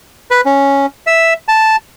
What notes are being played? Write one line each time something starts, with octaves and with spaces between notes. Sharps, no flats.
B4
C#4
E5
A5